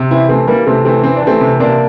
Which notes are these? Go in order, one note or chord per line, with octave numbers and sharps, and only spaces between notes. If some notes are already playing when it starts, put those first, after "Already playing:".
Already playing: C3
E3 C4 E4
E3 A3 C4
E3 G3 A#3
C3 A3 C4
E3 A3 C4
E3 C4
D4
E3 A3 C4
C3
C3 A#3 D4